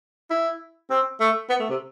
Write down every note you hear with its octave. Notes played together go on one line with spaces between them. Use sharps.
E4
C4
A3
B3
A3
C3